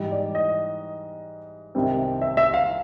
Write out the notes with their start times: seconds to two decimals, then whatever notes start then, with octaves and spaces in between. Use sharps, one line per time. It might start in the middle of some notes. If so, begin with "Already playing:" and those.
Already playing: G#2 E3 G3
0.11 D5
0.35 D#5
1.75 C2 C3 D#3 G3 C4
2.22 E5
2.37 E5
2.54 F5